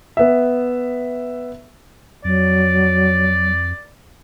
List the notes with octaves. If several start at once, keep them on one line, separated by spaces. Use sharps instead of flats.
B3 E5
F2 F#3 D5